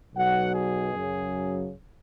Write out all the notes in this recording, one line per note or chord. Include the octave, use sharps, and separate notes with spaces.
B1 B2 F#3 F#5
G#4
F#2 C#3 F#3